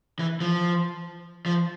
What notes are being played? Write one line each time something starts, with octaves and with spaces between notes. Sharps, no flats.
E3
F3
F3